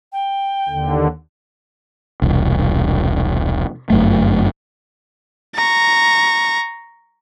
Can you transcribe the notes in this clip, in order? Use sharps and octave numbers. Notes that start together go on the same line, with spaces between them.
G5
D#2 D3
E1 C2
G1 F#2 A3
A#5 C#6